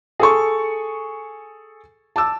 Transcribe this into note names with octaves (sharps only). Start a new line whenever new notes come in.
G#4 A4 C#6
A5 D6 E6